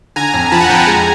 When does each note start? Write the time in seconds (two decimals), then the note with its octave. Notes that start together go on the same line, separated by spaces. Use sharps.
0.16 D3 G#5 A#5
0.34 F2
0.52 F3 A5 B5
0.61 F#5 G#5
0.69 F2 G5 A5
0.79 G#5 A#5
0.87 G#3